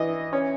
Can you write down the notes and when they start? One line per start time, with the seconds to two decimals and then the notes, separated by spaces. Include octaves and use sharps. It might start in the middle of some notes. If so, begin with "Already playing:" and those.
Already playing: E3 D#5
0.33 C#4